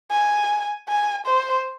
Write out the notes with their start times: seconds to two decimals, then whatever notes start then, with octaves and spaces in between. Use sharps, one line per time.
0.11 G#5
0.89 G#5
1.26 C5